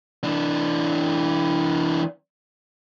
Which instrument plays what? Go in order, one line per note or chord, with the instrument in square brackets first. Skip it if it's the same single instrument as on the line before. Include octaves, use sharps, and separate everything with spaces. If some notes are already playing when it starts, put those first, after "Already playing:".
[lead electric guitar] E3 D4